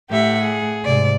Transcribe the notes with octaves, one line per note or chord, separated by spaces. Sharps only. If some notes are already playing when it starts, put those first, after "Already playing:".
A2 G4 E5 F#5
G#4
G#2 C3 D5